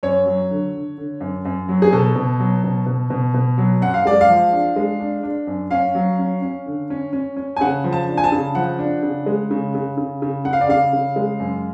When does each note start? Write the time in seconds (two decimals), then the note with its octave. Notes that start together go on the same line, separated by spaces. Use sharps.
0.03 F#2 C#5
0.26 F#3
0.50 D3
0.74 D3
0.98 D3
1.20 F#2
1.45 F#2
1.69 F#3
1.82 G#4
1.92 B2 A4
2.16 B2
2.40 F#3
2.64 B2
2.86 B2
3.10 B2
3.34 B2
3.58 F#3
3.81 F#2 F#5
3.94 F5
4.05 G#3 D5
4.21 F5
4.29 F3
4.53 D4
4.76 G#3
5.00 D4
5.23 D4
5.47 F#2
5.71 C#4 F5
5.95 F#3
6.19 C#4
6.42 C#4
6.66 D3
6.90 C#4
7.13 C#4
7.36 C#4
7.56 G#5
7.61 C#3 F#5
7.84 F3
7.93 A5
8.08 D4
8.17 G#5
8.24 A5
8.32 C#3
8.55 F3 F#5
8.79 D4
9.02 C#3
9.26 G#3
9.51 C#3
9.75 C#3
9.97 C#3
10.22 C#3
10.45 C#3 F#5
10.53 F5
10.61 D5
10.69 C#3 F5
10.93 C#3
11.16 G#3
11.40 F#2